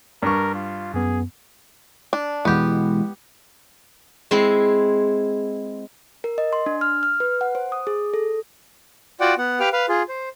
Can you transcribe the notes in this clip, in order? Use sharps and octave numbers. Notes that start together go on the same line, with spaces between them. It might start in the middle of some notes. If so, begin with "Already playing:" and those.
G2 A#4 C#6
F4
F#2 B3 G#4
D4
B2 E3 G#3 B3 G4
G#3 C4 E4
A#4
D#5
C6
D4
F6
F6
B4
F#5
C5
D#6
G#4
A4
F4 F#4 D5 F#5 G5
B3 F#5
G4 B4 F5 G5 F6
B4 F5
F4 G#4
C5